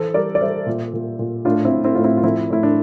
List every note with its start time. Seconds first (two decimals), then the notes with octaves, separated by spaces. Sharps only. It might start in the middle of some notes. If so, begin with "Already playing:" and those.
Already playing: E3 A4 C5
0.14 G3 A#4 D5
0.35 D5
0.41 G3 C5 E5
0.66 A#2
0.93 A#2
1.19 A#2
1.45 A2 D4 F4
1.65 C4 E4
1.71 A2
1.84 C4 E4
1.95 A2 F4
2.04 C4 E4
2.17 F4
2.24 F3 C4 E4
2.50 A2 E4
2.63 D4